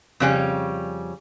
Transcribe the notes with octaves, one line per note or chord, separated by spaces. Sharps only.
F2 C#3 G3 C#4